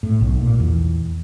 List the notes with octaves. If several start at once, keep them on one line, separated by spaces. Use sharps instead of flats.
A2
B1
A#2
E2